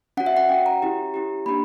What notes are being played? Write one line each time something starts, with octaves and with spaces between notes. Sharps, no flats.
C#4 F#4 F#5
E5
F#5
C#4 F#4 G5
A#5
C#4 E4 G4
C#4 E4 G4
A#3 D4 G4 B5